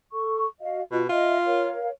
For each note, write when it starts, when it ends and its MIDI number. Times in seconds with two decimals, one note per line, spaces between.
0.13 0.45 69
0.13 0.45 85
0.61 0.82 66
0.61 0.82 75
0.61 0.82 77
0.91 1.06 47
0.91 1.02 65
0.91 1.02 75
1.09 1.72 65
1.09 1.44 75
1.09 1.44 76
1.46 1.89 70
1.46 1.89 73
1.46 1.89 77